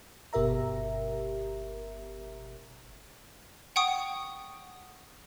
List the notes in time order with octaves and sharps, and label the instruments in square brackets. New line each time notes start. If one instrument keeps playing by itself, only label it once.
[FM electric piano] G1 B2 G4 A#4 E5 A#5
[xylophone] F#5 G5 C#6 D#6